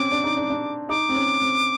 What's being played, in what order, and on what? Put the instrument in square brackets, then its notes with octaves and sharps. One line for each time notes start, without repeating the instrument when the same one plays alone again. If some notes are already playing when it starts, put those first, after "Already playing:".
Already playing: [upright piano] C4 C#4 [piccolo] D6
[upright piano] D4
D#4
D4
D4
[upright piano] D#4 [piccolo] D6
[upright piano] C4
C#4
C4